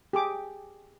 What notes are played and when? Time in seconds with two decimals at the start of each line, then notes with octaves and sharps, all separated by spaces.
0.13 G4 G#4 D6